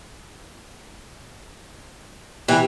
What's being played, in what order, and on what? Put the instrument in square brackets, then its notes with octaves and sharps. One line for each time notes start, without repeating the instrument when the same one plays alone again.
[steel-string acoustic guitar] C3 [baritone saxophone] E3 [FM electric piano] B3 G4 B4